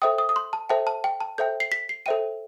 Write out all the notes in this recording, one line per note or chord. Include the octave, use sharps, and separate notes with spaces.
A4 C5 E5 G5 D#6
D#6
D#6
C6
A5
A4 C5 E5 G5 A5
A5
G5
A5
A4 C5 E5 G5 G6
C7
B6
C7
A4 C5 E5 G5 D#7